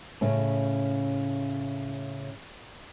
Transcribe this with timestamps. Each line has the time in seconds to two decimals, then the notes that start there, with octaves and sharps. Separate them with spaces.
0.21 A2 C#3